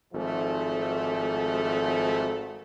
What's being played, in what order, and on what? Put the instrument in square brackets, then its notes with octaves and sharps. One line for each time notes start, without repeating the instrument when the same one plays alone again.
[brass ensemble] G#1 G#2 F3 A3